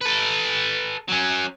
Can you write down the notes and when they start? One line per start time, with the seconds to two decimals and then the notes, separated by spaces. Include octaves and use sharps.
0.01 A4 B4
1.08 F#3 C#4